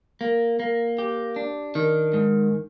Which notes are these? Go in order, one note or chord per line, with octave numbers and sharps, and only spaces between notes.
A#3
A#3
G4
D4
D#3
G#2